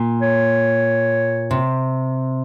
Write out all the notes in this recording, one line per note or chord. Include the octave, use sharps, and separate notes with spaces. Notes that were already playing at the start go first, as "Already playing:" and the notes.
Already playing: A#2
C#5
C3